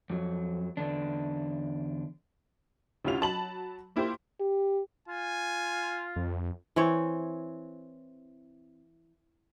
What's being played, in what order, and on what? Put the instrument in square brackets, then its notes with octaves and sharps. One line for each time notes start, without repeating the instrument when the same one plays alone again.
[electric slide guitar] F2 F#3
E2 D3 D4
[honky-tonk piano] D2 C3 C#4 E4 F4 F7
F#3 A5 B5 F#7
A#3 E4 F4 G4 C5
[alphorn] G4
[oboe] F4 [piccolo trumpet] G#5
[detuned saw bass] F2
[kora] E3 C4 C#5